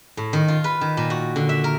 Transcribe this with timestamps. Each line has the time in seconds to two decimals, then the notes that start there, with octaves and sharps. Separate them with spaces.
0.17 A2
0.33 D#3
0.48 F4
0.64 B4
0.81 D#3
0.97 A#2
1.10 F#4
1.36 D3
1.49 E5
1.64 A#4